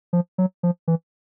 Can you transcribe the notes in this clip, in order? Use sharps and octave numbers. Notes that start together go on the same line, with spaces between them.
F3
F#3
F3
E3